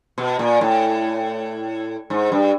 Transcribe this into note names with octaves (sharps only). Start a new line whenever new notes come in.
B2
A#2
A2
G#2
G2